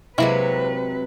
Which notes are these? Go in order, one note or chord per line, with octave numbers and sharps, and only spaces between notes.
C3 F#3 G#3 A#3 E4 B4